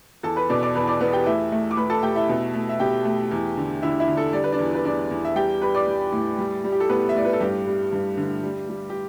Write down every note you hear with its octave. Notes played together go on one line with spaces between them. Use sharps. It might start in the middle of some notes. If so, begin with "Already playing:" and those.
E2 A4 A5
B4 B5
B2 D5 D6
D5 D6
E2 B4 B5
D5 D6
E2 B3 B4
G4 G5
A3 E4 E5
A3
D6
A3 B4 B5
A4 A5
A3 G4 G5
E4 E5
B2
A3
E5
B2 G4 G5
A3
E2
D3
D3 E4 E5
E4 E5
D3
A4
G3 D5
B4
D4 D5
E2
B4
E2 D4 D5
E2
E5
G3 G4 G5
G3 B4 B5
D5 D6
G3
A2
G3
G3
G4
A4
A2 B3 B4
E5
A2 D5
B4
A4
G2 G4
G3
G2
D3
G3
G3
G4